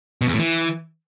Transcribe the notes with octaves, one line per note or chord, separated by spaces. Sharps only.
B2
E2
A2
E3